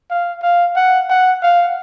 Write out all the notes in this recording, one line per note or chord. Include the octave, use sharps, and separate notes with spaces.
F5
F5
F#5
F#5
F5